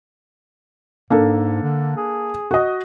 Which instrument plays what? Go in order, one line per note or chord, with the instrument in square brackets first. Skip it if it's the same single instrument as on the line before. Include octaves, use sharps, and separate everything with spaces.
[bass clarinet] G#2 [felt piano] A#3 D4 A4
[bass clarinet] D3
G#4
[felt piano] F#4 D#5